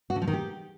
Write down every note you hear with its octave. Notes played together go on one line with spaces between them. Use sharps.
F#4
D3
F3
D#3
G4